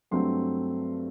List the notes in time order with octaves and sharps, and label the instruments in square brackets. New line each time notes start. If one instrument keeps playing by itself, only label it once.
[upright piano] G2 F#3 A3 C4 C6